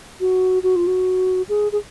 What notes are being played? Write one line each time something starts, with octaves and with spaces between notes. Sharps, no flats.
F#4
F#4
F4
F#4
G#4
G#4